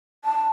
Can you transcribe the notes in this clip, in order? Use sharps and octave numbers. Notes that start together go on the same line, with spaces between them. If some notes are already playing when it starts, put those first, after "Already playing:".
A5